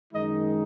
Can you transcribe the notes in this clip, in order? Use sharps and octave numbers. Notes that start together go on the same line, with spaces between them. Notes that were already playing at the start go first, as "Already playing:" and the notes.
F#2 D#3 G#3 D#4 D#5